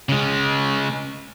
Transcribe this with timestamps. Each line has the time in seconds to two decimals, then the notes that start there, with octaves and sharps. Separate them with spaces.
0.09 C#3 G#3